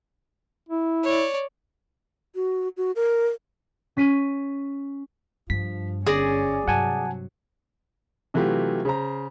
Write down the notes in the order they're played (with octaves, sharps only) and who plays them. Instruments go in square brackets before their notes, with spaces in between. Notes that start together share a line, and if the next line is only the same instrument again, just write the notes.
[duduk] E4
[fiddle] C#5 D5
[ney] F#4
F#4
A#4
[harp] C#4 B6 D#7
[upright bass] G2 [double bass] F3 [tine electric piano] B6
[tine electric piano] G1 A#6 [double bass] C#4 [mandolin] G#4 D5
[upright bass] G2 [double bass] C3 F#3 [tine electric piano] F#5 G#5 A5
[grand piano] C3 E3 F#3 A3 F4 G4
C#3 C5 A#5